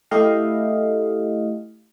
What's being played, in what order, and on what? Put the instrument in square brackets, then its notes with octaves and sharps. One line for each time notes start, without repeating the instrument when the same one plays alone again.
[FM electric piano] A3 E4 G4 A4 D#5 F5